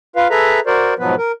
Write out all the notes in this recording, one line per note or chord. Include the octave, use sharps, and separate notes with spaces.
F4 B4 F5
G#4 A4 B4 E5 A#5
F#4 A#4 C5 D5
G#2 B2 F3 F#3 B3 B4
A#4